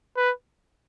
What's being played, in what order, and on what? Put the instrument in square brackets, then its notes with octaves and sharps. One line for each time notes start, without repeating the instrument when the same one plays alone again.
[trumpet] B4